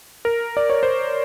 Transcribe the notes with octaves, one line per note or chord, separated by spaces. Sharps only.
A#4
D5
C#5
C5